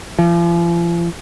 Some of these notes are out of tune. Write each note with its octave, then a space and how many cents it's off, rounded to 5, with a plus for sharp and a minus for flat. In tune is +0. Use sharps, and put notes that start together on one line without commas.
F3 -40